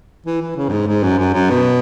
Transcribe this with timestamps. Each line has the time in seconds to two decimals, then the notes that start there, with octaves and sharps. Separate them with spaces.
0.26 E3
0.41 E3
0.57 C#3
0.69 F#2
0.72 G#2
0.88 G#2
1.04 F#2
1.19 F#2
1.34 F#2
1.50 B2